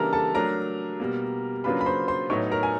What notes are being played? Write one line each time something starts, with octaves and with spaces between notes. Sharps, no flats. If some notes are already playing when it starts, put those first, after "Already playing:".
Already playing: C#3 E3 G3 A#3 D4 A4 A#4 A#5
A4 A5
F#3 A3 D4 A#4 A#5
B2 G3 A#3
C#3 F#3 A#3 D4 F4 B4 B5
B5
C5 C6
C5 C6
A2 F#3 B3 D#4 C#5 C#6
A#4 A#5
G#5